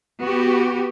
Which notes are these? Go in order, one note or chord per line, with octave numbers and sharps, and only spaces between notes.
B3 F#4 G4